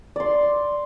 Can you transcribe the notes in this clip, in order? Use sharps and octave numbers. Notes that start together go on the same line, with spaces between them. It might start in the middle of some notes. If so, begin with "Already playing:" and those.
D5 C6